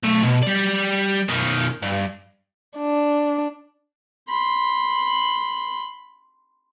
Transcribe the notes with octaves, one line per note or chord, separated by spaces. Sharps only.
B1 A3
B2
G3 D5
B2 D#3
G2
D4
B5 C6